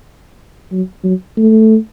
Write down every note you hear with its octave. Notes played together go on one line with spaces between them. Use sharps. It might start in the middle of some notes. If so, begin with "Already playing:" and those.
F#3
F#3
A3